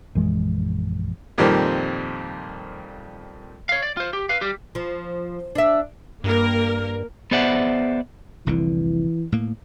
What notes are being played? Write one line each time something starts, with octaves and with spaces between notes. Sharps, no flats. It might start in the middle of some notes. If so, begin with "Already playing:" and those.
A#1 F#2 E3 G#3
F2 A#2 D#3 G3 C4
C#5 F5
D5
F4 C5
G4
B4 F5
G3 G4
F3
D4 E5
G2 A#3 A#4
B3 G#4 C5 D5 E5 F#5
F1 C2 D3 E3
A2 A#3